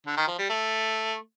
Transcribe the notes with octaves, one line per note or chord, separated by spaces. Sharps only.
D3
D#3
F3
G3
A3